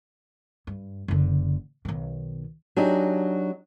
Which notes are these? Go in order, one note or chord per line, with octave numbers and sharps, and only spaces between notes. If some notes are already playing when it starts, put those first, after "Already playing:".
G2
F#1 D3
B1 D#3
F#3 D4 D#4 G4 G#4